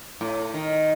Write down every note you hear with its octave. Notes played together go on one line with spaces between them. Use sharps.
A2
D#3